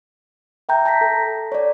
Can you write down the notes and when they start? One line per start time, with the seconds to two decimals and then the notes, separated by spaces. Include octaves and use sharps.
0.69 E5 G5 A#5 G6
0.85 A5 A#5 A#6 B6
1.01 A4
1.52 C#5 D5